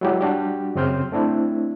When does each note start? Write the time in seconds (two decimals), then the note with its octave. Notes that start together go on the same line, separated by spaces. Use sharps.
0.01 F#3 G#3 E4 F#4 G4
0.21 G3 D4 F#4 G4
0.75 F#2 C#3 C4 C6 F6 G6
1.12 A3 C4 D4 E4